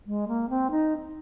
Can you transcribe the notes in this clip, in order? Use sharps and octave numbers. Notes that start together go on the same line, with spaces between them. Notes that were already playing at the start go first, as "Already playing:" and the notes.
G#3
A#3
C4
D#4